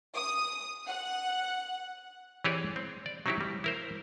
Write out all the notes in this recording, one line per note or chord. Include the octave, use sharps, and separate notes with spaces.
D#6
F#5
E3 C4 G4 G#4 C#5 D5
C4
D5
F#3 C4 D#4 E4 F#4 G4
G3
E4 A#4 C5